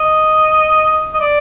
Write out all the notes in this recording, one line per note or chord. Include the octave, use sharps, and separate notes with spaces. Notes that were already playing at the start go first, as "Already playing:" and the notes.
Already playing: D#5
D#5
D5